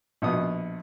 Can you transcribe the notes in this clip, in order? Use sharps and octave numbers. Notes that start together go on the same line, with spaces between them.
A#1 B2 D#6